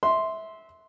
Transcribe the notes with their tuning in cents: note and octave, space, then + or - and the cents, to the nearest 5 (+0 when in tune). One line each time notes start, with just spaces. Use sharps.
E5 -20 C6 +0